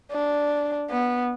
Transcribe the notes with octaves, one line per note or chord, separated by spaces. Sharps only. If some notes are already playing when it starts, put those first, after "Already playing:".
D4
B3